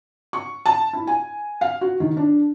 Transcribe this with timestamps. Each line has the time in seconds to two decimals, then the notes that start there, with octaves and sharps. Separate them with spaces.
0.33 C#6
0.66 A5
0.93 E4
1.07 G#5
1.61 F5
1.81 F#4
2.00 D#3
2.17 D4